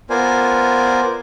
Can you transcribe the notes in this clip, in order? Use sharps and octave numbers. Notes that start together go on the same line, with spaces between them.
B3 F4 A#4 C5 D5 G#5